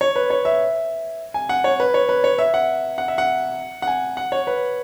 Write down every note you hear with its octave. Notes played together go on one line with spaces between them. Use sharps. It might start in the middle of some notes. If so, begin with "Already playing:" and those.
C#5
B4
C#5
E5
G#5
F#5
C#5
B4
C#5
B4
C#5
E5
F#5
F#5
E5
F#5
F#5
G#5
F#5
C#5
B4